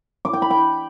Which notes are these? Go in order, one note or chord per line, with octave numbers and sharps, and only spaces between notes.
D6
G5
B5
G5